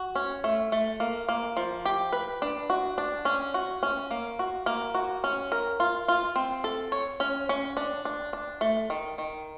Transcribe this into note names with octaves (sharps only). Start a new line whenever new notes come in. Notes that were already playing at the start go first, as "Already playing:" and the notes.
Already playing: F#4
C#4
A3
A3
A#3
A#3
F3
G4
B4
D4
F#4
D4
C#4
F#4
C#4
A#3
F#4
A#3
F#4
C#4
A#4
F4
F4
C4
A4
C#5
C#4
C#4
D4
D4
D4
A3
D#3
D#3